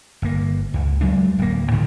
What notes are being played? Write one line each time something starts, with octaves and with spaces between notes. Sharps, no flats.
G1 A#3
C#2
E2 F#3 G#3 D4
D1 A#3
G#2 D3 D#3 F3